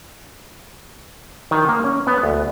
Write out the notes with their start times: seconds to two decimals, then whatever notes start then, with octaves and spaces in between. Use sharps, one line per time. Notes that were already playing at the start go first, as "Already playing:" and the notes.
1.51 D#3
1.69 A#3
1.84 C#4
2.07 B3
2.23 D2